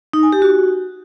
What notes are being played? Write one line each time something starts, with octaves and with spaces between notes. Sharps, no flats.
D#4
G#5
G4
F#4